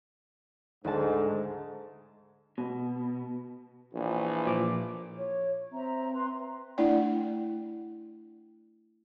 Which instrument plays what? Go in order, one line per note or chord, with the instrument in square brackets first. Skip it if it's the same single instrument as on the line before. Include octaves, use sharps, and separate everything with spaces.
[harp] D2 A5 [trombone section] G#2
[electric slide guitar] B2
[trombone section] A#1 E3
[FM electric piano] A#2 F3 D6
[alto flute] C#5
[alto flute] C4 [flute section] E5 A#5
[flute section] B4 C6
[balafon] A3 D4 E4 D5 F#5 G5